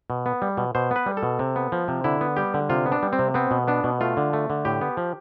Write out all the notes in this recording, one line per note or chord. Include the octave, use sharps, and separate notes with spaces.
B2
B3
G3
B2
B2 C5
B3 B4
G3
A4
B2
C3
B3
F3
C3
D3 E4
B3
G3 G4
D3
C3 F4
B3
D4
G3
C4
C3
B3 C4
B2
B3 D4
B2
A3 F4
D3
A3
D3
A2 G4
B3
F3